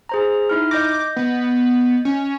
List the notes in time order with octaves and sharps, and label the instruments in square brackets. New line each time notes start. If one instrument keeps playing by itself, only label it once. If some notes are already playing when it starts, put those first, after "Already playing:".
[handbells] G#4 C5 A#5
D#4 E4 F6
[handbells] D#5 G6 A#6 [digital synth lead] D6
[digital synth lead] B3
C#4